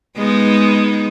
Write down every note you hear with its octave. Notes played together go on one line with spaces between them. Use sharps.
G#3 B3 D#4